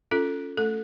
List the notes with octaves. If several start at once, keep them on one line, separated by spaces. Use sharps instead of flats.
C#4 F4 A4
A3 A4